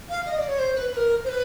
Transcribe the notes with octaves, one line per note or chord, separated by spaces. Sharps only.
F5
D#5
D5
C#5
C5
B4
B4
A#4
C5
B4